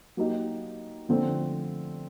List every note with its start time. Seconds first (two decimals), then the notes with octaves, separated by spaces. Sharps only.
0.17 F#3 A#3 D#4 G4
1.09 D3 F3 A3 C4